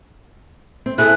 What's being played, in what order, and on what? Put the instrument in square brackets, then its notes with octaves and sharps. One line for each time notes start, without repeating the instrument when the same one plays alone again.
[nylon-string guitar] C4
[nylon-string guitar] E4 G#4 A4 [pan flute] F#6